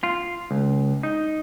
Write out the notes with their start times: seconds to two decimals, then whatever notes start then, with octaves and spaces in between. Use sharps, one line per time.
0.03 F4
0.51 C#2
1.03 D#4